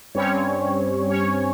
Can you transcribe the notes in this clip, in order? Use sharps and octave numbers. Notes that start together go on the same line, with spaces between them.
G2 G3 C4 C#4 C#5
C#4 C#5